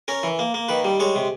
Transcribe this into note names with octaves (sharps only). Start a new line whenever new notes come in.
C#4 A#4
E3
A#3
A#3
D#3 B4
G3
G#3 C#5
C3